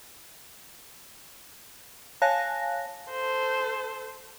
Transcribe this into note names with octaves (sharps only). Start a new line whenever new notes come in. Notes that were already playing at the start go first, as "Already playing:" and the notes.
C#5 F5 G#5 A5 F#6 A#6
A4 C5